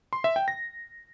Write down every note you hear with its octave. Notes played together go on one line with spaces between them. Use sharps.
C6
E5
G5
A#6